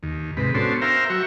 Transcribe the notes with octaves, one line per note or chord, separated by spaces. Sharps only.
D#2
G#2 C3 B4
B3 C#4 D4 F#4 A4 C5
A#4 C5 E5 F5 G5 A#5
F#3 F#4 E5 G5 C#6